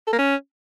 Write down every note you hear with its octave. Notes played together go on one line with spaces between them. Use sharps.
A4
A#3
C#4